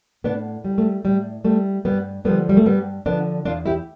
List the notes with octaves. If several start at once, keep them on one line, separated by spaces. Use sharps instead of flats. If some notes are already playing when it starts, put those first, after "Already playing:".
A2 B3 D4
G3
A3
A2 G3
G3 A3
G2 G3 B3
D3 F3 G3 B3
G3
A3
G2 G3 B3
D3 F3 B3 D4
E2 D4 F4
E4 G4